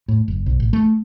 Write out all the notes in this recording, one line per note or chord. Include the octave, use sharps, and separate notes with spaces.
A2
F#1
B1
A1
A3